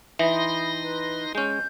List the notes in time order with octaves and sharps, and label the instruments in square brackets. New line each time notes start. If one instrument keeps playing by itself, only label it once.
[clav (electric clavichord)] E3 [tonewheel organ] D#4 C6 A#6 [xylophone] E5 [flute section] B5 D#6
[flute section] B4
[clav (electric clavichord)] G#3 C#4 [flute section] G6